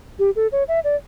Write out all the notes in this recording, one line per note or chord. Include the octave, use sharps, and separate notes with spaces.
G4
A4
C#5
E5
D5